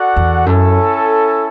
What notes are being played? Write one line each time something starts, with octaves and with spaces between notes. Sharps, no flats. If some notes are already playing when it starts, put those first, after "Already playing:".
Already playing: F#4 A4 D5 F#5
E2
F#2 C#4 E4 A4